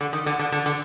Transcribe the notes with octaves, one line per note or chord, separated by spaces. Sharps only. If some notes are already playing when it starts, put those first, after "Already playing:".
D3
D#3
D3
D3
D3
D3